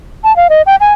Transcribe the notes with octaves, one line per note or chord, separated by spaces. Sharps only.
A5
F5
D#5
G5
G#5